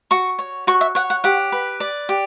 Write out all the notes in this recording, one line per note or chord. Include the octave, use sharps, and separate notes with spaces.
F#4 C#6
C#5
F#4 C#6
E5
C#5 F#5
F#5
G4 F#5
B4
D5
G4